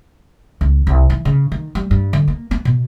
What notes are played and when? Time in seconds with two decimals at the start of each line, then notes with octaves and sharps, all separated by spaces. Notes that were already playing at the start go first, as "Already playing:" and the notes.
0.61 C#2
0.87 C2
1.10 E3
1.25 C#3
1.52 D#3
1.75 G3
1.91 G2
2.13 D3
2.28 A#3
2.51 B3
2.65 B2